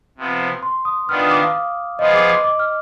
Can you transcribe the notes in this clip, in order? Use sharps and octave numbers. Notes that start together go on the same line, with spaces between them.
C3 F3 B3
C6
D#6
D#3 B3 D4 F4 F6
D#6
D6
F5
F3 B3 F4 G#4 D#5
D6
D6
D6
F6